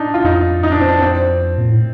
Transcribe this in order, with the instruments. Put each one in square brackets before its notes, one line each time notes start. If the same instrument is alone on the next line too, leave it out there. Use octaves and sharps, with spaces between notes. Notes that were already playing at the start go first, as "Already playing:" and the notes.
Already playing: [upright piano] D4 D#4
F4
[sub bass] F2 [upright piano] D#4
[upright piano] D#4
D4
C4
D4
C4
[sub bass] A#2
A2